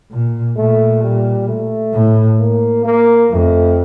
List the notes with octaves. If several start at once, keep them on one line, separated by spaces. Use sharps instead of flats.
A#2
A#2 A3
G3
A3
A2
A#3
A#3
F2 A3